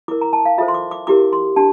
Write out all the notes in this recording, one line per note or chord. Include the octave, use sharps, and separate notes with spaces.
E4 A#4 D6
A#5
A5
F5
F4 A4 C5 E5
C6
D6
D6
E4 G4 A#4 D6
C6
D4 G4 A5